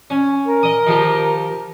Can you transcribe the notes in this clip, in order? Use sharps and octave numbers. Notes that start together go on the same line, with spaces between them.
C#4
A#4
D#5 D#6
D#3 F3 G4